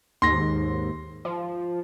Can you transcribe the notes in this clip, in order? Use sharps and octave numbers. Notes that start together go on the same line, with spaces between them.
D#2 G#2 C6 A#6
F3